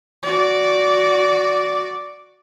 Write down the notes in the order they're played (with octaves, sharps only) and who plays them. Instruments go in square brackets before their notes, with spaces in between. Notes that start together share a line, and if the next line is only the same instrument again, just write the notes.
[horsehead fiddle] F#4 D5